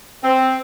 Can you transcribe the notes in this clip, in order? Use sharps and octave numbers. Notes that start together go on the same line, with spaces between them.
C4